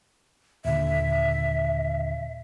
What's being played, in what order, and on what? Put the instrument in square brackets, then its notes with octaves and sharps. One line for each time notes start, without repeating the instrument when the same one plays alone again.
[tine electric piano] D#2 A#2 D3 [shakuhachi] E5